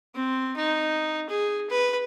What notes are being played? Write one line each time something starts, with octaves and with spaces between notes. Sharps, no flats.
C4
D#4
G#4
B4